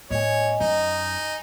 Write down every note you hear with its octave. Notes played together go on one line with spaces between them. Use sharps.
A2 B3 C#5 D#5 G#5
F#2 D#4